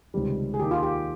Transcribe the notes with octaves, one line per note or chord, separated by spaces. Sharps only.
C#2 C3 D#3 G3
G#4
D#2 D#3 A#3 G4
F4
G4